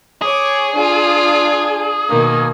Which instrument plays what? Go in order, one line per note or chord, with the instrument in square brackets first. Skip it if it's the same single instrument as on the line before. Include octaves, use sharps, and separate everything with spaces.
[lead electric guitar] G#4 [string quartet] C#5 D6
[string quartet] D4 F4
B2 D#3 A#3